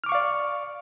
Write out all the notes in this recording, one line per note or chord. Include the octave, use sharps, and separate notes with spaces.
D5 F5 C#6 D6 F6